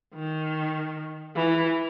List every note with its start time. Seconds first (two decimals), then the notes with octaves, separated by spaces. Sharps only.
0.15 D#3
1.36 E3